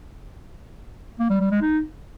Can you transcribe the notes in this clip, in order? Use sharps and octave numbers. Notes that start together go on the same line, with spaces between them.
A#3
G3
G3
G#3
D#4